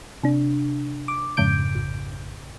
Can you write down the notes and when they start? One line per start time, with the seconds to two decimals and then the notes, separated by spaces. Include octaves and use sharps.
0.23 C3 D4
1.08 D6
1.37 F2 G#2 C#3 G6 D7
1.75 A1